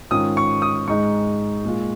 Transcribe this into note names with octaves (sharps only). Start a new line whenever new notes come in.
G#2 D#3 C#4 F4 D#6
C#6
D#6
G#2 G#3 D#4 C#6
A#2 G#3 F4